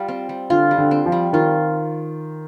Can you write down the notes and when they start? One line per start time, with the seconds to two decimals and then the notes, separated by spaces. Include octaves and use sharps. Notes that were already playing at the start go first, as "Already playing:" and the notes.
Already playing: G3 F4
0.08 C4
0.29 G3
0.50 D3 F4
0.71 G3
0.78 D3
0.91 C4
1.06 F3
1.12 G3
1.33 D#3 F4